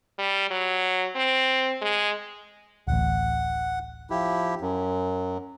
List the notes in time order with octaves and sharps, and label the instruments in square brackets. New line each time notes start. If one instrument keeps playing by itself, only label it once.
[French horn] G3
F#3
C4
G#3
[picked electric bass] D1 A1 [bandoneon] F#5
[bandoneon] F3 E4 G4
F#2